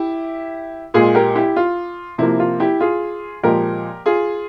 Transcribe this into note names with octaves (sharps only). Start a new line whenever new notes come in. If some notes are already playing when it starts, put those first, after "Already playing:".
Already playing: E4 G4
A#2 G#3 F4 G#4
G4 A#4
E4 G4
F4
C3 F3 A#3 E4
F4
E4 G4
F4 G#4
A#2 F3 G#3 G4 A#4
F4 G#4